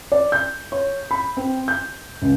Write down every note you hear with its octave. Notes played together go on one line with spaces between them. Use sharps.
D5
G6
C#5
B5
C4
G6
C#2